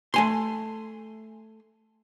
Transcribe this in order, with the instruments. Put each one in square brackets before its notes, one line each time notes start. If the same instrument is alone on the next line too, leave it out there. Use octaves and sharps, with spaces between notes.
[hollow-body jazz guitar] A3 G#5 C6